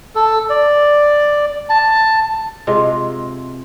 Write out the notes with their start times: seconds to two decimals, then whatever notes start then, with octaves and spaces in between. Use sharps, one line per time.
0.15 A4
0.50 D5
1.70 A5
2.67 C3 G#3 F4